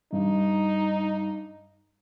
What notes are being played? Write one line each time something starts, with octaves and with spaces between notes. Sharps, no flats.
G2 D#4